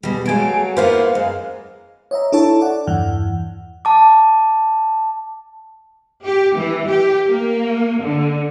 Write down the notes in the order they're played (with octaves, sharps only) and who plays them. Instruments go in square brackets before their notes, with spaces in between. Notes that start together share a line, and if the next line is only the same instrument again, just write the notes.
[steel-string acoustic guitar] B2 G3 [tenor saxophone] G#3
[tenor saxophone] F#3 [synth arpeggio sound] G#3 G#5 D7 [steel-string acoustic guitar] A3 F5
[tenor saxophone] A#3 [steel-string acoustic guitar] B3 E4 F4 [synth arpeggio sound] B4 C5 F5
[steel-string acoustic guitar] F#2 [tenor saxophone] G#3
[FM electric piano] C#5 D#5 E5 A#5
D4 E4 A4 C#5 E5 A5
D5 F#5
E2 G2 E3 F#5
[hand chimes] A5 D6
[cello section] G4
E3
G4
A#3
D3